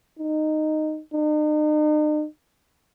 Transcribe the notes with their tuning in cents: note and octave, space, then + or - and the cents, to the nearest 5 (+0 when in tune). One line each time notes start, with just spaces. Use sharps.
D#4 -10
D#4 -45